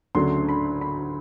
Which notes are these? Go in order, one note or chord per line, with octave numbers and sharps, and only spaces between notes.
D2 C#3 F#3 A3 D4 C6
B5
B5